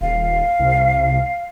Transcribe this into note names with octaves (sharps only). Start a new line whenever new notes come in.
D#1 F5
C2